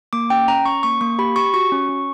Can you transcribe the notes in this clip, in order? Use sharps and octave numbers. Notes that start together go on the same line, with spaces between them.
A#3 D6
C#4 G5
C#4 A#5
C#4 C#6
A#3 C#6
A#3 C#6
G4 B5
G4 C#6
F#4 C#6
C#4
C#4